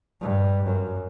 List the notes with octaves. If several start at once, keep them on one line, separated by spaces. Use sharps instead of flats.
G2
F#2